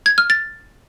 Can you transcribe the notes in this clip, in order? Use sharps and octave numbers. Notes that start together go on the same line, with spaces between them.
G#6
F6
A6